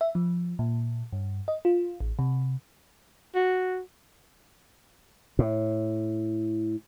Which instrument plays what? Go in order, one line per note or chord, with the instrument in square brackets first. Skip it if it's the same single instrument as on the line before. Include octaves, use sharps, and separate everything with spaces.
[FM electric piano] E5
F3
A#2
G2
D#5
F4
A1
C3
[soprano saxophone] F#4
[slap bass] A2